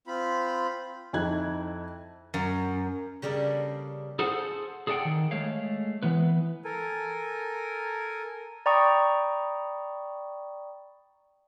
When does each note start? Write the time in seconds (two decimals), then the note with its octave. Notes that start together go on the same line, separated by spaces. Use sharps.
0.07 C4 F4 B5
1.13 F2 D#4 E4 F#6 G#6
2.34 F#2
3.22 C#3 G3 A#3 D4 A4
4.19 G#4 A4 C5 F#5
4.87 G#4 A4 D5 E5 F#5 G5
5.05 D#3
5.31 G#3 A3 C#5 F5
6.03 E3 B3 B4
6.65 A4 A#4 G#5
8.66 D5 G5 A#5 B5 C#6 D#6